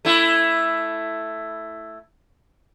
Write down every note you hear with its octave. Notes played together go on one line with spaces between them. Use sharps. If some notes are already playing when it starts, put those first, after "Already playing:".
A3 E4